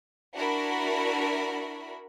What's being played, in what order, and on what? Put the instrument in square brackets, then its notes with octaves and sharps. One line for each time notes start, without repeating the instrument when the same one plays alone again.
[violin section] D4 E4 F#4 A#4 B5